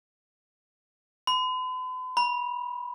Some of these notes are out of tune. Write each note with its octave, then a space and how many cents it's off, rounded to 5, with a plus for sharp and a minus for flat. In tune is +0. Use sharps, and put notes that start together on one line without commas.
B5 +45
B5 -25